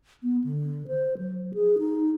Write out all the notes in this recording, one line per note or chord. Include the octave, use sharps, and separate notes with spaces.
B3
D3
C5
F#3
G#4
D#4